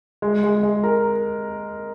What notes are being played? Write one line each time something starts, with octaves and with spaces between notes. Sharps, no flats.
G#3
G#3
G#3
A#4